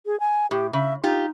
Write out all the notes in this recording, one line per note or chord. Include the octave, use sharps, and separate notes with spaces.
G#4
G#5
A2 G4
C#3 E5
D#4 F4 G4